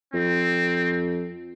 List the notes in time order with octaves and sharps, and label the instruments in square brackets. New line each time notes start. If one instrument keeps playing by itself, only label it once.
[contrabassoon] F2 [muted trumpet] C4